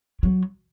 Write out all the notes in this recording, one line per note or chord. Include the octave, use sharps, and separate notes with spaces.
F#3